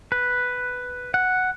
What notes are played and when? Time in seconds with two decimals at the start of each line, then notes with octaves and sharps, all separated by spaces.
0.12 B4
1.14 F#5